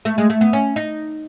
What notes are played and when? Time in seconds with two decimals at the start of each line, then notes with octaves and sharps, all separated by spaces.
0.05 A3
0.18 G#3
0.30 A3
0.41 B3
0.53 C#4
0.76 D#4